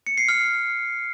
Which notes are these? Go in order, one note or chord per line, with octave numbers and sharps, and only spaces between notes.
C#7
C7
F6